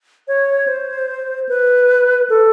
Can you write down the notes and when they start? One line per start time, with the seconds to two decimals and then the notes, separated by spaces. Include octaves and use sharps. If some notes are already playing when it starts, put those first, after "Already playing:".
0.28 C#5
0.67 C5
1.49 B4
2.30 A4